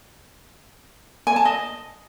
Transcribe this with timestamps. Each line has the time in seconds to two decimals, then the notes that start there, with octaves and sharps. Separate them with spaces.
1.27 G#5
1.36 A5
1.45 D#5